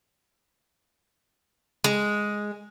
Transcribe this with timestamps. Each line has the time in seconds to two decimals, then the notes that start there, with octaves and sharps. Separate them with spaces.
1.84 G#3